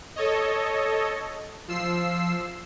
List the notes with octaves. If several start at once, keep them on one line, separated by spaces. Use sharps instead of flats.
A4 C#5 D#5
F3 E6 C7